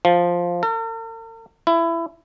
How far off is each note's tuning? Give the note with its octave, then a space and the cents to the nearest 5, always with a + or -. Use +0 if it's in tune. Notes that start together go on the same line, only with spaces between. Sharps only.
F3 +0
A#4 -45
E4 +20